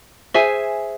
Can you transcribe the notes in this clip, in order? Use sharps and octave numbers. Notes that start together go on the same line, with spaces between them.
G#4 C5 E5 G#5